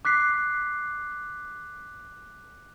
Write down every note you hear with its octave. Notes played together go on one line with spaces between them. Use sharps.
D6 F#6 B6 C7